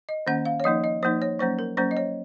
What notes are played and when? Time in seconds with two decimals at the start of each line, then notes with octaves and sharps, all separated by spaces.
0.09 D#5
0.27 D#3 A#3 C#4 F#5
0.45 F5
0.60 C#5
0.64 F3 A#3 D#4 D#5
0.84 D#5
1.03 F3 A#3 D#4 C5
1.22 C#5
1.39 F#3 A#3 C#4 C5
1.59 A#4
1.77 F#3 A#3 C#4 C5
1.91 D#5
1.97 C#5